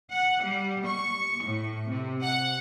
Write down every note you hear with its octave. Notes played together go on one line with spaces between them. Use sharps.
F#5
G3
C#6
A2
C3
F#5